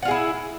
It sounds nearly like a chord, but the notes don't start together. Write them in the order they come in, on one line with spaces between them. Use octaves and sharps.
F#5 F4 G#4 E4